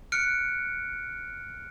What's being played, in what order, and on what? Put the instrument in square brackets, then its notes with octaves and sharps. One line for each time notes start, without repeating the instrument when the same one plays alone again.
[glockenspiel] F6 F#6 C#7 D7